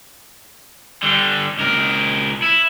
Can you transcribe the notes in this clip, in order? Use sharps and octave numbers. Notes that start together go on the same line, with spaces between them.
D3 G3
C#2 A#4
E4